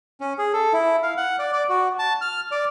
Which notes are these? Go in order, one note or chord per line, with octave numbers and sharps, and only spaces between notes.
C#4
G#4
A4
E4
F5
F#5
D5
D5
F#4
A5
F6
D5